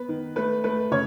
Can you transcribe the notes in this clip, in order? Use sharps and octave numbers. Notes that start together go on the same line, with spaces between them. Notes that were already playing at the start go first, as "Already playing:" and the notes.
Already playing: B3 B4
D#3
A3 B4
A3 B4
C#3 C#5